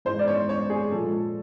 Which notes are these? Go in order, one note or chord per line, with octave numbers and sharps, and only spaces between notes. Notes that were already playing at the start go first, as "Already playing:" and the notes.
G#2 E3 G#3 C5
D5
C#5
C#5
G#4
A#2 F3 G#3 A4